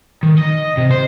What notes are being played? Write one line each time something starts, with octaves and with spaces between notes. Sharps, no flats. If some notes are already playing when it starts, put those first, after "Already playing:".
D#3
D#5
C3
C5